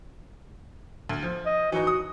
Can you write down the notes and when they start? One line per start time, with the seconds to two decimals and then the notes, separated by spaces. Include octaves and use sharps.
1.09 D2
1.22 F3
1.46 D#5
1.72 E3 D#4 F#4
1.87 D#6